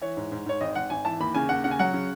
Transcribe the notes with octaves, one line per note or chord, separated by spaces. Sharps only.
E3 C#5
G#2
G#2
G#2 C#5
G#1 D#5
G#1 F#5
G#1 G#5
E3 A5
D#2 B5
C#3 G#5
D#2 F#5
C#3 F#5
G#5
F#3 F#5
C#3